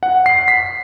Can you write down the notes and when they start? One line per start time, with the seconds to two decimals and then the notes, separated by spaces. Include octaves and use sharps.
0.03 F#5
0.26 C7
0.48 B6